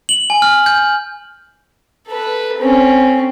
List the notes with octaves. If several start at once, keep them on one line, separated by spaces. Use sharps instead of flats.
F#7
G#5
F6
G6
A4 B4
C4 C#4